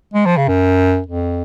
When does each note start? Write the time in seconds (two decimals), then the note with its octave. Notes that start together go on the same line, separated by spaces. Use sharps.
0.13 G#3
0.25 F3
0.37 C#3
0.48 F#2
1.07 F2